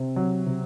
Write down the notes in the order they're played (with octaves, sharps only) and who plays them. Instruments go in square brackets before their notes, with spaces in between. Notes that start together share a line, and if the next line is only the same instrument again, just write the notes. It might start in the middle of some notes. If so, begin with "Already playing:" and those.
Already playing: [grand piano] C3 [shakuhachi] C4
[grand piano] F#3
[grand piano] C3 [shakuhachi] C4